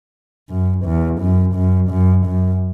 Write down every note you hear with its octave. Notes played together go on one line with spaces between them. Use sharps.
F#2
E2
F#2
F#2
F#2
F#2